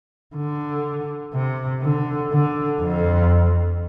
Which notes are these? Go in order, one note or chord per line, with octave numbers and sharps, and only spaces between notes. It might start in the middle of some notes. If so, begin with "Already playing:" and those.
D3
C3
D3
D3
F2